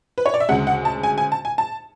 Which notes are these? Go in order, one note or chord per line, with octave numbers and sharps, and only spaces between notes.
B4
C#5
D5
E5
D2 C#3 G#3 F#5
F#5
A5
G#5
G#5
A5
G#5
A5